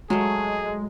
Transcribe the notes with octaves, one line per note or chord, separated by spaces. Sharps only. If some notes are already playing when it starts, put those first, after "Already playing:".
F#3 G#3 A3 G#4